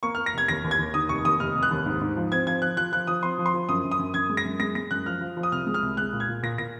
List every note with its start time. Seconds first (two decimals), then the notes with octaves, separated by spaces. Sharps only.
0.03 A#3 C#6
0.15 A#3 F6
0.26 A#6
0.34 F1 G#6
0.48 D#2 A#6
0.64 D#2
0.71 G#6
0.79 D#2
0.94 D#3 D#6
1.09 F1 C#6
1.24 D#2 D#6
1.40 F1 F6
1.56 F1
1.63 F#6
1.70 D#2
1.86 G#2
2.01 G#2
2.17 F3
2.32 C4 G#6
2.47 F3 G#6
2.62 F3 F#6
2.77 F3 F#6
2.92 F3 F#6
3.07 F3 D#6
3.23 C4 C6
3.38 F3
3.46 C6
3.54 F3
3.69 F#2 D#6
3.84 F#2
3.91 D#6
3.99 F#2
4.14 F#2 G#6
4.29 G#3
4.37 A#6
4.45 F#2
4.60 G#3 A#6
4.75 G#3 A#6
4.91 F#2 F#6
5.06 F3 F6
5.21 F3
5.37 F3
5.43 D#6
5.52 C2 F6
5.67 G#3
5.74 F6
5.83 C2
5.97 G#3 F#6
6.13 A#2
6.20 G#6
6.28 A#2
6.43 A#2 A#6
6.58 A#2 A#6